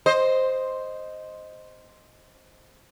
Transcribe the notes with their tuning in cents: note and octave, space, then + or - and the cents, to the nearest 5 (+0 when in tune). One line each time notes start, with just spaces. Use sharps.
C5 +0 D#5 +0